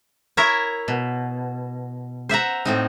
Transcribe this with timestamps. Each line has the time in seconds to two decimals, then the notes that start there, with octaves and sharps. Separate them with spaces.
0.37 E4 A#4 C#5 E5 A#5
0.88 B2
2.29 C5 E5 F#5 A#5
2.65 A2 C4 D#4